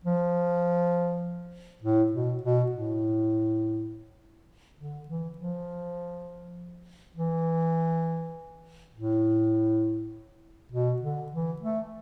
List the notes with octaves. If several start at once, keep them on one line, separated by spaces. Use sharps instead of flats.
F3
A2
B2
B2
A2
D3
E3
F3
E3
A2
B2
D3
E3
A3